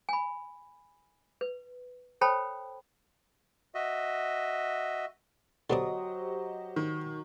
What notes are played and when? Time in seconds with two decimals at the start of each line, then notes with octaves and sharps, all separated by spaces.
0.09 G#5 B5
1.41 B4
2.21 A4 C5 C#5 G5 A5 B5
3.75 F#4 D#5 E5
5.70 D3 F#3 B3 D4 G4 C5 D#5 D#6
6.76 D#3